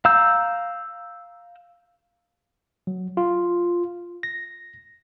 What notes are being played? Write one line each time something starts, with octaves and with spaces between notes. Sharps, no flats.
F5 A#5 E6 G6
F#3
F4
A#6